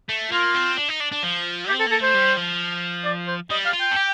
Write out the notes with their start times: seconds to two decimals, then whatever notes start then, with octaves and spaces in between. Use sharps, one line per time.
0.09 A3
0.32 A#3 F4
0.55 C4
0.77 D4
0.89 D#4
1.00 D4
1.12 D4
1.23 F3
1.69 G4
1.72 C4
1.80 A4
1.86 A#3
1.91 A4
2.00 A3 C5
2.14 G3
2.37 F3
3.05 D5
3.28 C5
3.50 G3 D#5
3.66 F5
3.73 F4
3.81 G5
3.92 A4
3.96 G4